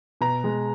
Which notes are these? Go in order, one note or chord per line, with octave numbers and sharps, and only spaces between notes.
B2 A#5
G#3